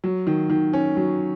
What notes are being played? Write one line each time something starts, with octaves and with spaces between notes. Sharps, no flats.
F#3
D#3
D#3
C#4
F#3